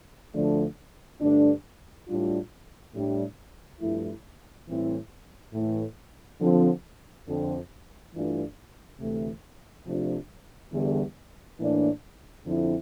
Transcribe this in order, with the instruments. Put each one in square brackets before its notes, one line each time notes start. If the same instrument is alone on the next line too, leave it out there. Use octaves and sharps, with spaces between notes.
[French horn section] D2 D3 F3 A3 D4
G2 D3 A3 D4
A2 G3 D4 F4
A2 G3 D4
G2 F3 A3 E4
A2 E3 G3 C4 E4
A2 E3 A3
D3 F3 C4
F2 D3 F3 C4
G2 E3 A3 D4 F4
D2 C3 E3 A3
C3 F3 A3 D4 F4
E2 D3 G3
A2 E3 A#3 D4
F2 D3 F3 C4 E4